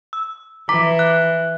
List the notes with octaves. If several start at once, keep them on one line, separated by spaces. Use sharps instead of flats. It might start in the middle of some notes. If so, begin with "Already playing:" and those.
E6
E3 A#5 D6 B6
F#6